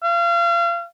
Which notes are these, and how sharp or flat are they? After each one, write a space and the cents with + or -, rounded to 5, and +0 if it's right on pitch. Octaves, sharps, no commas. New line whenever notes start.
F5 -35